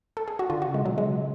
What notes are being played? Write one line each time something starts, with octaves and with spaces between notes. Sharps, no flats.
A4
G#4
F#4
D3 F4
F#4
C#3
G#3
B2 F#3
C#3 G#3